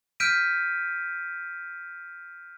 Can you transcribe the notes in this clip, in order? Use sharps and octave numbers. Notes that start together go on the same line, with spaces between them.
F6 G6 B6 D7 D#7